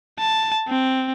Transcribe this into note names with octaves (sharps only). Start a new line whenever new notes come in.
A5
C4